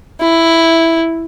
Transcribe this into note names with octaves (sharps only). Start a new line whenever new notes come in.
E4